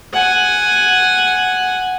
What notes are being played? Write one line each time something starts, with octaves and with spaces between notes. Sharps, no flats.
F#5 G#5